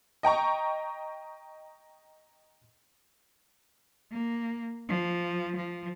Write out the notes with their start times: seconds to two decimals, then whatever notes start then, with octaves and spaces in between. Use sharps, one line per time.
0.23 D#5 G5 A#5 C#6
4.12 A#3
4.89 F3
5.57 F3